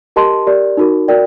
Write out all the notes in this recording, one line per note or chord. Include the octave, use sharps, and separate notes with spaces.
G4 A#4 D#5 A5 C6
G4 A#4 D5
D#4 F#4 A#4
F#4 A#4 D5 G5